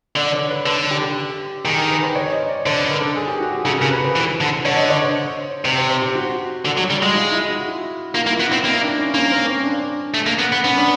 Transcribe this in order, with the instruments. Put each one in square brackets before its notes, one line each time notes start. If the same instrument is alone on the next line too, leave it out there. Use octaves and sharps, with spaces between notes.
[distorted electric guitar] D3 [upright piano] D5
[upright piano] C#5
B4
[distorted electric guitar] D3 [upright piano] A4
[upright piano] G4
[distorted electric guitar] D#3 [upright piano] G#4
[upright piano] A#4
B4
C5
C#5
D#5
D5
[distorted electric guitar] D3 [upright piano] C5
[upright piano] B4
A#4
A4
G#4
G4
F#4
G#4
[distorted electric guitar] C#3 [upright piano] A4
[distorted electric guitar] C#3 [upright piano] A#4
[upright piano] B4
C5
[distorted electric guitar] E3
D3
[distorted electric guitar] D3 [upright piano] C#5
[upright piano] D#5
C#5
C5
[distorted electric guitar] C3 [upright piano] C5
[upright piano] C5
C5
G4
F#4
[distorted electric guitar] D3
F#3
G3
G#3
[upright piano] F4
E4
F#4
[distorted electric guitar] A#3 [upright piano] F4
[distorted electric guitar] A#3
[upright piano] E4
[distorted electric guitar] B3
[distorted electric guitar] C4 [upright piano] E4
[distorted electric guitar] A#3 [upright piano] D#4
[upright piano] D4
C#4
[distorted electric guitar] A#3 [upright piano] C#4
[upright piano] C4
C#4
D4
[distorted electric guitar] A3
A#3
B3
B3
[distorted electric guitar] B3 [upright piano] C#4
[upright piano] D4